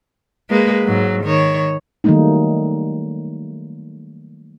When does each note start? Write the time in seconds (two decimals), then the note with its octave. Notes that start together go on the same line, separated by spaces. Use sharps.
0.50 G#3 A#3 B4
0.84 G#2 F#3
1.24 D#3 C#5
2.04 D#3 F#3 G3 A3 A#3 D#4